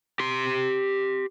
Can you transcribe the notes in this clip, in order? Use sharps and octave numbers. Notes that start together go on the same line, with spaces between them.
G4 C6